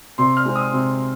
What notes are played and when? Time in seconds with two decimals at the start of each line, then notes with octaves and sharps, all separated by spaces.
0.18 C3 C6
0.37 F6
0.45 G#3 C4 D#4
0.56 D#6
0.73 C3